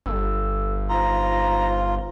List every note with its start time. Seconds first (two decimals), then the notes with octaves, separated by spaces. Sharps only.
0.06 G1 A4 E6
0.89 D#4 F4 C5 A#5